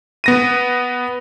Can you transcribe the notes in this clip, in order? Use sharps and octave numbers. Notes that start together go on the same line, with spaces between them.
B3 A#6 D#7